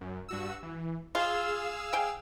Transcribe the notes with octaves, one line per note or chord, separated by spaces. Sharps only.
F#2
G2 F#4 E6
E3
F4 G#4 F5 E6
G5 G#5